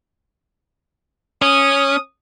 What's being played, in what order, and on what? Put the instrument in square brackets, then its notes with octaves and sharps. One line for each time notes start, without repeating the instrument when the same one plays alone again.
[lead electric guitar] C#4 [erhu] D#6